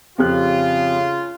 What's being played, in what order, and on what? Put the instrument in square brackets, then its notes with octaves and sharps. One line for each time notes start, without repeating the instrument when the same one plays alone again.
[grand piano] F2 G4 F#6 [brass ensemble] C#3 F4